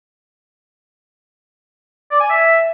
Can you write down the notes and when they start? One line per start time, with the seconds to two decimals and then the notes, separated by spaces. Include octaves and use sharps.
2.11 D5
2.20 G#5
2.30 E5